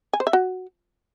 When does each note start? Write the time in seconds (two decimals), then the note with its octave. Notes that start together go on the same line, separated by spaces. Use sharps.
0.13 G#5
0.20 C5
0.27 E5
0.33 F#4